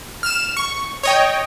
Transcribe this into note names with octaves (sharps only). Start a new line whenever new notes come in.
F6 E7
C#6
C#5 D#5 G5